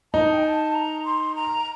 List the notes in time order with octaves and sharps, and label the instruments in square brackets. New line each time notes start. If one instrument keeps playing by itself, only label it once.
[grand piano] D#4 [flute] A5
[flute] G5
A5
A#5
C6
A#5